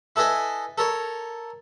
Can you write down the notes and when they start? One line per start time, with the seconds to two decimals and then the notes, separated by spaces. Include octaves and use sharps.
0.16 E4 A4 B4 D#5 G#5
0.78 A4 A#4 C#5